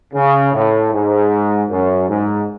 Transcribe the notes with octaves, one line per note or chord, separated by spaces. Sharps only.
C#3
A2
G#2
F#2
G#2